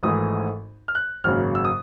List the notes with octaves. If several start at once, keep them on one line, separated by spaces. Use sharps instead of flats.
G#1 G#2 E3 A3 D#6
F6
F#6
G#1 F#2 C#3 F#3 A#3 F6
E6
D#6